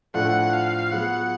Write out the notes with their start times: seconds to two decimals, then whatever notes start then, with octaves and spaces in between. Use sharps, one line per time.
0.14 A2 F3 A3 D4 F4 F#5
0.53 F5
0.92 F#3 B3 F4 G#4 F#5